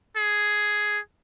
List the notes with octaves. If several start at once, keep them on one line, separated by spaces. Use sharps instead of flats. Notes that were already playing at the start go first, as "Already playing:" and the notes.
G#4